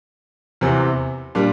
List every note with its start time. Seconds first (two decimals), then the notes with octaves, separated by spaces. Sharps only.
0.61 E2 C3 E3
1.35 A#2 G3 D4 F4